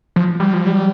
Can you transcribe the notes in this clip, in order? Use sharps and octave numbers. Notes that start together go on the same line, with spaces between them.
F3
G3
F3
G3